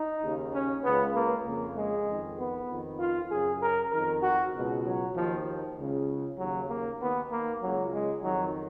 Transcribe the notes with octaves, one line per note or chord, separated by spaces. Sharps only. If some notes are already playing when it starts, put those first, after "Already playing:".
Already playing: D#4
D#2 C#3
C#4
C#2 C#3 B3
A#3
F2 C#3 A#3
G#3
F2 D#3
B3
F2 D#3
F4
F#2 C#3 G#4
A#4
F2 D#3 A#4
F#4
C#2 B2
F#3
D#2 D#3 F3
C#2 C#3
D#2 C#3 F#3
A#3
D#2 D#3 B3
A#3
C#2 C#3 F#3
G#3
F2 D#3 F#3